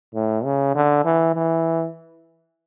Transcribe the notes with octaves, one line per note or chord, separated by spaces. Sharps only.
A2
C#3
D3
E3
E3